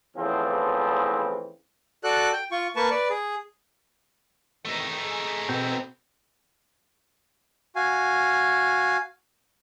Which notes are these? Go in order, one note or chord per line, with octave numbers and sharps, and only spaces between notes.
E2 C#3 E3 F3 A3 C4
F#4 A4 D5 F#6
G5
F4 C#6
A#3 B4 A5 C#6
B4 D5
G#4
E2 C3 D#3 A3 D#4
G#4
B2 C4
F#4 F5 G#5